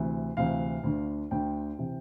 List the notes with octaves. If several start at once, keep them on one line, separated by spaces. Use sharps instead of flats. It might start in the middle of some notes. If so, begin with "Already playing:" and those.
Already playing: D2 C3 E3
D2 C3 E3 F5
D2 D3
D2 D3 G5
C3 E3